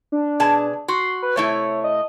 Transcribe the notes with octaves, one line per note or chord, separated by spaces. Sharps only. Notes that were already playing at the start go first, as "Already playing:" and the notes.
D4
B2 G#4 A5
F#4 C6
B4
C3 A3 E4 C#5
D#5